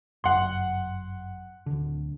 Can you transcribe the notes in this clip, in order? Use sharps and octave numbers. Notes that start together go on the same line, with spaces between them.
G1 F#2 F#5 C6
D1 D3